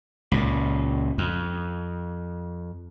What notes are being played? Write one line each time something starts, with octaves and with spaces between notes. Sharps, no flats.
C#2 A#2
F2